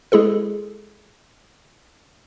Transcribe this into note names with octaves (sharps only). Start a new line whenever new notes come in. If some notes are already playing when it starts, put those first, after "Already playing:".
G#3 E4 G#4 A4